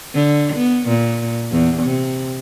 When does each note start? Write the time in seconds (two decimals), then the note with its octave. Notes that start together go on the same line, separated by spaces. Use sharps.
0.14 D3
0.56 B3
0.89 A#2
1.51 E2
1.82 C3